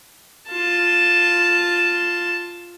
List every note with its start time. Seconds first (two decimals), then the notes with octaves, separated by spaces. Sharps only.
0.50 F4 A5